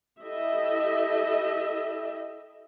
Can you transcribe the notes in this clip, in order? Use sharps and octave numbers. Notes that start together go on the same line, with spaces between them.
E4 G4 A4 D#5 E5